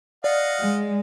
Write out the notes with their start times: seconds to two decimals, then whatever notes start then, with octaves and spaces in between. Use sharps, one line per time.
0.24 D5 D#5 F5 F#5
0.60 G#3